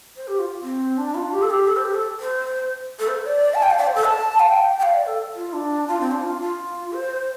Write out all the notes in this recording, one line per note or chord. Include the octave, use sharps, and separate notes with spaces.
C5
G4
F4
C4
D4
F4
G4
A4
G4
A4
C5
G4
A4
C5
A4
C5
D5
A5
G5
F5
D5
C5
A4
A5
F5
G5
G5
F5
D5
A4
F4
D4
F4
C4
D4
F4
F4
C5